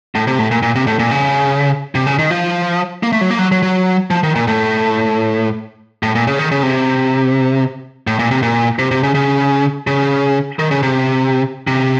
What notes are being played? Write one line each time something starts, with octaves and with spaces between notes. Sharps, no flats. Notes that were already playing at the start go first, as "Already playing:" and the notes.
A2
C3
A2
A#2
A#2
C3
A2
A#2
C#3
C3
C#3
D#3
F3
A#3
A3
F#3
A#3
F#3
F#3
F#3
F3
D#3
A#2
A2
A2
A#2
C#3
D#3
C#3
C3
A2
A#2
C3
A#2
C3
C3
C#3
C#3
C#3
D#3
C#3
C3
C3